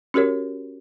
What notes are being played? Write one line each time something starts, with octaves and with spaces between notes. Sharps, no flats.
C#4 F#4 G4 A#4 C#5